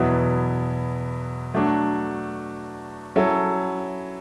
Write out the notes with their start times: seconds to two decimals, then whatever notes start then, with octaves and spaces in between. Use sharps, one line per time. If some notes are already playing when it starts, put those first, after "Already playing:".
Already playing: E2 B2 F#3 B3 E4
1.54 F#3 A3 D4 F#4
3.16 F#3 C#4 E4 A4